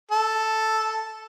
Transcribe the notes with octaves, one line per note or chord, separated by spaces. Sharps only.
A4